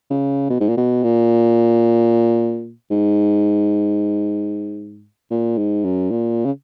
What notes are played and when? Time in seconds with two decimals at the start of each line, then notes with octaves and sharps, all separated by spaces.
0.10 C#3
0.50 B2
0.60 G#2
0.69 A#2
0.77 B2
1.03 A#2
2.91 G#2
5.31 A#2
5.58 G#2
5.85 F#2
6.11 A#2
6.45 C#3